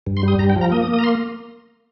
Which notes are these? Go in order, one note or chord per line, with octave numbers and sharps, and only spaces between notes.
G2
C6
G3 D#6
G2 A#5
G5
F3
A#5
A#3 D#6
D#6
A#3
D#6
A#5
C6